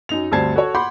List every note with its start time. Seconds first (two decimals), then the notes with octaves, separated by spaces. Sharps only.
0.09 F#2 D#4 F7
0.32 D2 G2 C4 A5 G#6 C7
0.56 F#4 A4 C#5
0.75 F#5 B5 C6 D6 G6